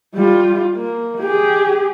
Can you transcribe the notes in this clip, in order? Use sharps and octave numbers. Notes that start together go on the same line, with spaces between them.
G3 F4
A#3
G4 G#4